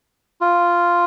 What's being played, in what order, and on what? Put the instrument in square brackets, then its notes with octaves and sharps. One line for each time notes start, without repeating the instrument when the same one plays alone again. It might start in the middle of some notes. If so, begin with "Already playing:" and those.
[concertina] F4